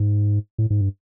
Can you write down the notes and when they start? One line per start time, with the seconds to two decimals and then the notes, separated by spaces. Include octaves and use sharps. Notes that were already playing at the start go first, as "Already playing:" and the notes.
Already playing: G#2
0.58 A2
0.70 G#2
0.81 G2